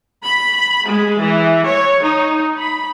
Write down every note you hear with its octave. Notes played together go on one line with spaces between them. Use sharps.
B5
G#3
E3
C#5
D#4
B5